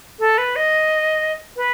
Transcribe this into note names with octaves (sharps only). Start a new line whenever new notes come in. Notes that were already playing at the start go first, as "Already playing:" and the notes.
A4
B4
D#5
B4